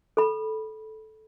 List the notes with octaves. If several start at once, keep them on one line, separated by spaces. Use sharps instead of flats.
A4 B5